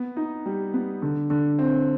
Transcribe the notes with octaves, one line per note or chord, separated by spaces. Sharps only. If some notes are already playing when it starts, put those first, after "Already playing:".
Already playing: B3
D#4
G3
B3
D3
D3
C4